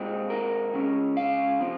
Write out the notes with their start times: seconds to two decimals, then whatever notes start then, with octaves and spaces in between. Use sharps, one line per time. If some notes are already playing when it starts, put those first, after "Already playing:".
Already playing: A#2 G#3 C4
0.30 A#4
0.74 C#3 G#3 C#4
1.17 F5
1.60 C3 F3 C4